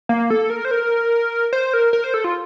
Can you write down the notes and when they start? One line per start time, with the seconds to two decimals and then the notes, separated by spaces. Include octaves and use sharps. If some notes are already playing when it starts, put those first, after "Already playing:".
0.09 A#3
0.30 A4
0.50 A#4
0.65 C5
0.71 A#4
1.53 C5
1.74 A#4
1.93 A#4
2.04 C5
2.14 A4
2.24 F4